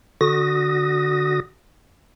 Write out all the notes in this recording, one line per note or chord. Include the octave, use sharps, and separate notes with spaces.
D3 F#4 D#6 A#6